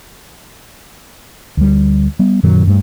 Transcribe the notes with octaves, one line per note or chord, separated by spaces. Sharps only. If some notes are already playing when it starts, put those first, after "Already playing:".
D2 G3
G3 B3
F#2 A#2 D#3 F#3
G2 A3